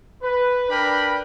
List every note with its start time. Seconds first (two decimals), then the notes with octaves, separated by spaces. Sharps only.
0.23 B4
0.70 D4 A#4 B4 G5 B5